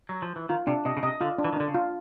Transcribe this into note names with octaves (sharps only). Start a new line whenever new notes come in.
F#3
F3
E3
D#3 F4
C3 D4
C3 D#5
C#3
C3 D#5
D3 F4
D4
E3
D#3
D3 D4
C#3
F4